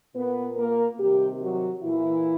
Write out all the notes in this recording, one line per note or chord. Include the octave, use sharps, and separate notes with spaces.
A#2 B3 B4
A#3 A#4
C3 D#3 G3 G4
F#3 F#4
A#2 E3 E4